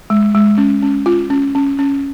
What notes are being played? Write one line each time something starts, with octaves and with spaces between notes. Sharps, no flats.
G#3
G#3
C#4
C#4
F4
C#4
C#4
C#4